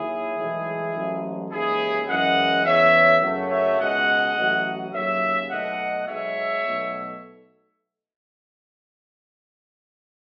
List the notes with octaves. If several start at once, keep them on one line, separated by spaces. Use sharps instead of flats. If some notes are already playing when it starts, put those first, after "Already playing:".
Already playing: D#2 D#3 F#3 E4 G#4
B1 A2 E3 G#3
A1 G#2 F#3 A3
D#2 C#3 E3 G#3 E4 G#4
F#2 E3 G#3 D#5 F#5
E2 C#3 E3 C#5 E5
F#2 C#3 F#3 A3
C#5 E5
C#2 B2 G#3 D#5 F#5
A1 A2 F#3 A3
D#2 C#3 F#3 C#5 E5
B1 B2 A3 D#5 F#5
B1 B2 G#3 C#5 E5
B1 B2 A3